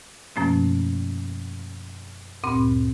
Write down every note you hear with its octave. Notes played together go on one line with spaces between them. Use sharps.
F#2 B2 F3 A3 A#3 C#4
D2 G2 A#2 C4 B5 C6